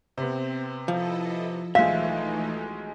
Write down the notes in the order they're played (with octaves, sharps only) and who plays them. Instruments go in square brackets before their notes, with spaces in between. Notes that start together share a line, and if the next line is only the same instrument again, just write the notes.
[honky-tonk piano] C3 B3 [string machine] C4
[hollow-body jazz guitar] F3 [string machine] E4 A4 D#5
[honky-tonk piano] B1 F3 G#3 [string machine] E3 A3 D#4 [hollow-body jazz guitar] E5 [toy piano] F5